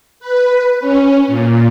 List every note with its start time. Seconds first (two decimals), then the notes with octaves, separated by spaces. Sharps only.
0.20 B4
0.80 C#4
1.27 A#2